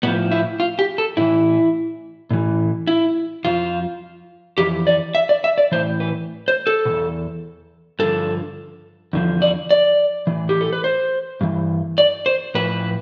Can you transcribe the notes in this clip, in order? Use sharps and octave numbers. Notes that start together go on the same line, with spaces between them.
A2 F3 B3
E4
F4
G4
A4
A2 E3 E4
A2 E3
E4
F2 D3 F3 F4
F2 E3 G4
D5
E5
D5
E5
D5
A2 E3 C5
B4
C5
A4
B2
E2
G2 D3 F3 A4
E2 D3 F3
D5
D5
A2 E3
G4
A4
B4
C5
G2 E3
D5
C5
A2 F3 B4